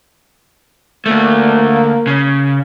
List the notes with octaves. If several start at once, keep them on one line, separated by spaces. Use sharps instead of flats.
D2 A3 A#3
C#3